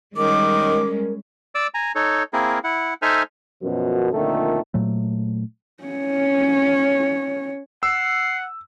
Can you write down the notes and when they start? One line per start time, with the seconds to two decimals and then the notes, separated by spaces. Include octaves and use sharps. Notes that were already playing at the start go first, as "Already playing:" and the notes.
0.17 D#3 G3 G#3 C#4 A#4 D6
1.55 D5 D6 E6
1.74 G#5 A#5
1.95 D#4 A4 C#5
2.33 A#3 C4 E4 G#4 A#4
2.64 E4 F#5
3.02 D#4 A4 C5 E5 G#5 F6
3.62 F#2 B2 F3
4.13 F2 A#2 D3 D#3 A3 A4
4.74 A#2 F#3 A3
5.83 C#4 C#5
7.83 F#5 E6 C7